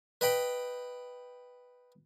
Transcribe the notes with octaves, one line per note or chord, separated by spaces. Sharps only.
B4 D#5 G5 B5